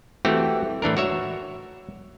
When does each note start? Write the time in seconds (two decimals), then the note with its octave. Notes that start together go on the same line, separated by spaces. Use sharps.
0.25 E3 A3 C4 F#4 G4
0.82 A2 E3 D4 A#4
0.97 F#4 C#5 E5